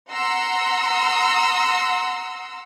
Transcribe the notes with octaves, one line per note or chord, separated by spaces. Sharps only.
F#5 A#5 C6 E6